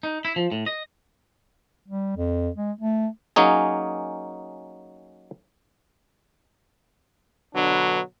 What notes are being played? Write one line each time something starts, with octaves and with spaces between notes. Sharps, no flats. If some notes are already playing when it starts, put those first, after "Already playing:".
D#4
E4
F3
A2
D#5
G3
F2
G#3
A3
F#3 A#3 C#4 D#4 G#4
B2 D3 F#3 D4 B4